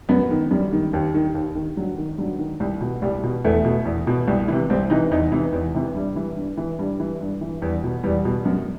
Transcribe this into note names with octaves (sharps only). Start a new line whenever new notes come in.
F#2 B3
D#3
F#2 G3
D#3
D#2
D#3
D#2
D#3
G2 F#3
D#3
G2 F#3
D#3
C2
B2
C2 G3
B2
E2 A3
B2
E2
B2
C2
C3 E3
C2 C4
C3 E3 D#4
E2 D#4
C3 E3
E2
C3 E3
G2 G3
E3
G2
E3
G2 G3
E3
G2
E3
E2 G3
B2
E2 G3
B2
F#2